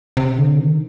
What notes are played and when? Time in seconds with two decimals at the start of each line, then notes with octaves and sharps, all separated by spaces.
0.17 C3
0.38 D3
0.59 D#3